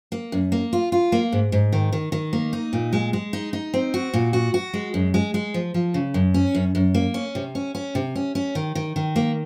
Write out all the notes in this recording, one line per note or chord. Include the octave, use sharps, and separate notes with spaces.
A#3
F#2
A#3
F4
F4
A#3
G#2
G#2
D#3
D#3
D#3
A#3
D#4
A#2
G#3
G#3
D#4
D#4
C4
F#4
A#2
F#4
F#4
G#3
F#2
G#3
G#3
F3
F3
C#3
F#2
C#4
F#2
F#2
A#3
C#4
C3
C#4
C#4
C3
C#4
C#4
D#3
D#3
D#3
A#3